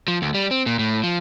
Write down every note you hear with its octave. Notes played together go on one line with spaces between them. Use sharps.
F3
D2
G3
C4
A#2
A2
F3